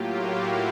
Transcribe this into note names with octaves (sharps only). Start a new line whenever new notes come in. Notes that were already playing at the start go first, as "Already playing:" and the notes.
Already playing: A2 F#3 A#3 F4 G4
E4 F#4